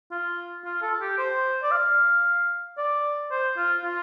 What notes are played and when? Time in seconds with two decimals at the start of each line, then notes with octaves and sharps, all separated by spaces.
0.11 F4
0.65 F4
0.82 A4
1.01 G4
1.18 C5
1.63 D5
1.71 F5
2.78 D5
3.31 C5
3.57 F4
3.84 F4